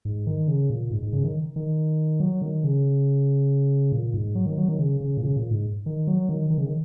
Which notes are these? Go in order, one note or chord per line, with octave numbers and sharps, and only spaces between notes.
G#2
D#3
C#3
A#2
G#2
G#2
C#3
D#3
D#3
F#3
D#3
C#3
A#2
G#2
F#3
D#3
F#3
D#3
C#3
C#3
A#2
C#3
A#2
G#2
D#3
F#3
D#3
D#3
C#3
D#3